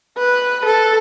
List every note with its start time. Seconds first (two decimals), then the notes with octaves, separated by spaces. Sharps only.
0.18 B4
0.65 A4